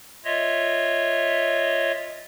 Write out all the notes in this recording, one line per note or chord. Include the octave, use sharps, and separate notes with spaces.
F4 C#5 D#5 E5